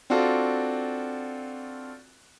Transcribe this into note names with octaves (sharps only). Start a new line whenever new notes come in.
C4 D4 F4 F#4 A4